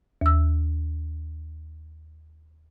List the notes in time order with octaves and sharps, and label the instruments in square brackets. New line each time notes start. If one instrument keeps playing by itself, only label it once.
[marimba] D#2 E6